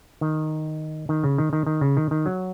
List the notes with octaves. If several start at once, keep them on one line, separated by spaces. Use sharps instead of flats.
D#3
D#3
C#3
D#3
D#3
D#3
C#3
D#3
D#3
F#3